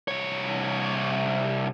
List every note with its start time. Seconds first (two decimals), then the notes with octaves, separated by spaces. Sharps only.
0.08 C2 C#5